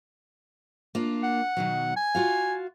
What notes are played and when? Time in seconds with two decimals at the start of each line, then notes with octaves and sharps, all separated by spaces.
0.95 A#3 D4 F4
1.23 F#5
1.57 B2 D#3 F#3
1.96 G#5
2.15 F4 F#4 F5